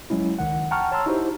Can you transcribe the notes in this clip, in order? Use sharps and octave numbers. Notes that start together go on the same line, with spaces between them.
F#3 G#3 C#4 E4
C#2 D#3 F#5
F#5 G5 A5 A#5 C#6 F6
C#5 A5 A#5 C6 E6
D#4 E4 F#4 G4 C5